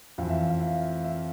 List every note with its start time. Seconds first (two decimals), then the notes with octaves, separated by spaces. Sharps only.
0.18 F2 F5
0.23 E3
0.29 E5
0.50 F5
0.61 E5
1.04 E5